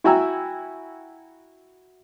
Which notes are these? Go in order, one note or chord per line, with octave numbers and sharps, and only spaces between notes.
E4 F#4 G5 G#5 A#5 E6